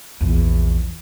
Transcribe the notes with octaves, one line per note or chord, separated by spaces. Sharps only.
A#1 E2